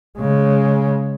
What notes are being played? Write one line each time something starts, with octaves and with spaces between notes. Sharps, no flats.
C#3 G#3